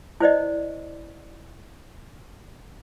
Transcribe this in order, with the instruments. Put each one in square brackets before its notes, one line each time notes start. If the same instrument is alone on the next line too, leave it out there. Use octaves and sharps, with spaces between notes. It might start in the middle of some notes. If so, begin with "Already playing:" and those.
[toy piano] E4 C5 D5 D#5